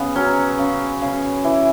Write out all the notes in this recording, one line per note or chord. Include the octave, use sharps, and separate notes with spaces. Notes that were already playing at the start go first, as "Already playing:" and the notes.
Already playing: C#3 B3
F#3 C#4
C#3
C#3
E3